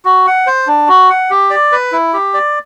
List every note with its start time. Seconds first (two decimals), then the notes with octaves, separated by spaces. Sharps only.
0.05 F#4
0.27 F#5
0.47 C5
0.67 D4
0.88 F#4
1.10 F#5
1.30 G4
1.50 D5
1.72 B4
1.92 E4
2.14 G4
2.34 D5